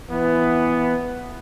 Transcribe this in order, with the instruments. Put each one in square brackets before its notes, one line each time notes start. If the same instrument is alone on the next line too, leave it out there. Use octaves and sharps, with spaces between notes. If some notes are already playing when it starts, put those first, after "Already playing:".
[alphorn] E3 [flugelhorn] B3